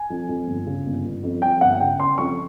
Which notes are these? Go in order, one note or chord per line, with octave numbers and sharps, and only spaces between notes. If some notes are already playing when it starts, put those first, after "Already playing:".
Already playing: G#5
F2
F2
G1
C#3
G1
G1
F2
F2 G5
G1 F#5
C#3 G5
C#3 C6
F2 C#6